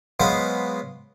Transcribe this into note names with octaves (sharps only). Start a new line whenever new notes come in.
F#3 G#3 B3 C5 F5